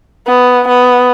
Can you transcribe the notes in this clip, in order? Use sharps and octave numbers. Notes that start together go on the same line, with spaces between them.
B3
B3